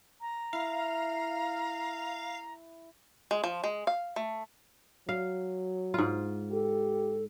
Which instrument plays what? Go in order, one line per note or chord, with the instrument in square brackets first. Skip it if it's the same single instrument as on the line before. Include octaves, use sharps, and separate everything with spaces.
[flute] A#5
[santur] E4 [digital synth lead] F5
[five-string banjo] G#3
F3
G#3
F5
A3
[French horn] F#3 [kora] F5
[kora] G#2 F4
[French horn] G4 [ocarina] A4